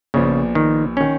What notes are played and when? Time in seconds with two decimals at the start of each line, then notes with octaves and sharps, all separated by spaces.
0.14 A#1 A#2 C#3 F3 B3
0.55 D#3
0.97 D#3 C#4